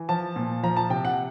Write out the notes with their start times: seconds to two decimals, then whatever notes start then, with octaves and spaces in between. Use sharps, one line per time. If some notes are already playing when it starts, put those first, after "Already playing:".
Already playing: E3
0.09 F3 A5
0.36 A#2
0.63 F3 A#5
0.77 A5
0.90 C3 G5
1.05 F#5